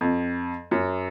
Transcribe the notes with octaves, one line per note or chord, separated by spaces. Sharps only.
F2
F#2